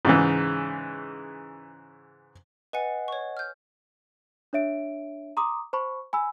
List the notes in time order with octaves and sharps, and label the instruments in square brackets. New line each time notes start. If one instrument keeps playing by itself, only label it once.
[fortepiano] G#2 C#3 E3
[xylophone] B4 G#5 C#7 [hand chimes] D#5 F#5
[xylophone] C#5 C#6
F6 G6
[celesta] D4 C#5 E5 D7
A#5 C6 D6 D#6
C5 A5 B5 C#6
G#5 B5 E6